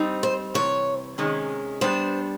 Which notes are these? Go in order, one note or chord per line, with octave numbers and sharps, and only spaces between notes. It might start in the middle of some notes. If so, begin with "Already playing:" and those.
Already playing: G3 C4 D#4
C5
C3 E3 G3 C#5
C3 D#3 G#3 C#4
G3 B3 D4 C5